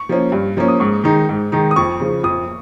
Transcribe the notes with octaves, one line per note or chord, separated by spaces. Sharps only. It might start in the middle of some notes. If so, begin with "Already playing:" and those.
Already playing: C#6
F3 A#3 C#4
G2
F3 A#3 C#4
D#6
G#2 C#6
D#3 G#3 D#4
G#2
D#3 G#3 D#4
D#6
F2 C#6
C#3 F3
F2 D#6